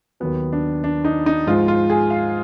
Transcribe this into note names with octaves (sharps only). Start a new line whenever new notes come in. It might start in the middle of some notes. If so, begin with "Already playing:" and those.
D#2 D#3 F#3 B3
D4
D4
D#4
D#4
G#2 F3 G#3 F4
F4
G#4
F5